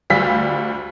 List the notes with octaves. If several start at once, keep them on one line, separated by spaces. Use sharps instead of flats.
D2 G3 F4 E6 B6